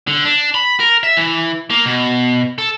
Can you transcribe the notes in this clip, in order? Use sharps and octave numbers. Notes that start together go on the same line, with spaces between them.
D3
D4
B5
A#4
E5
E3
A#3
B2
A4